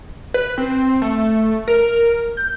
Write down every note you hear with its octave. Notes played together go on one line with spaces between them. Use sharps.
B4
C4
A3
A#4
G6